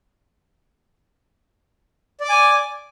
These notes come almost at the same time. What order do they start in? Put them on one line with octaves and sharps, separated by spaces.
D5 D6 G#5